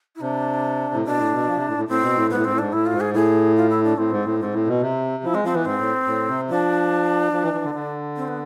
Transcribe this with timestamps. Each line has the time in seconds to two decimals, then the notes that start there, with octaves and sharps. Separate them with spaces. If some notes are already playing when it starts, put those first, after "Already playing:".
0.15 E4
0.21 C3 D4
0.94 A2
1.05 B2 D4
1.19 A2
1.33 B2
1.47 F3
1.57 C3
1.68 A2
1.78 A2
1.88 A2 C4
2.02 B2
2.16 A2
2.30 G#2 B3
2.37 A2
2.44 G#2 C4
2.52 A2
2.58 G#2 D4
2.72 A2 E4
2.86 F4
2.93 G#2
3.00 G#4
3.14 A2 G#4
3.56 F4
3.70 E4
3.84 D4
3.98 A2 C4
4.11 G#2
4.25 A2
4.40 G#2 C4
4.54 A2
4.67 B2
4.81 C3
5.23 F3 E4
5.34 G#3 C4
5.44 F3 C4
5.55 E3 B3
5.65 G#2 C4
5.79 A2
6.07 A2
6.28 C3
6.49 F3 D4
7.33 F3
7.43 E3
7.54 E3
7.64 D3
7.75 D3
8.16 C4
8.28 B3